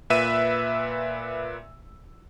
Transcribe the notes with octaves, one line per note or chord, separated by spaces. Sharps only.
A#2 B4 E5 E6 D#7